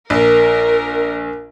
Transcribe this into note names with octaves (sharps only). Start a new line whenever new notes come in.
A#1 A#4